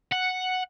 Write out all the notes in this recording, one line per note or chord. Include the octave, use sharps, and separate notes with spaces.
F#5